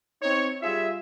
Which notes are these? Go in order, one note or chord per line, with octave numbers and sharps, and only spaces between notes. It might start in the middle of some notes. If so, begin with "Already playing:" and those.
C4 D#4 C#5
G3 F4 G#4 E5